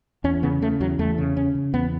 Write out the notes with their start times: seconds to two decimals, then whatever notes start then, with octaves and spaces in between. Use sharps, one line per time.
0.24 E2 C#4
0.43 C#3 B3
0.62 C#3 A3
0.80 E2 F#3
0.99 E2 A3
1.18 C#3
1.36 C#3 C#4
1.55 C#3
1.73 E2 B3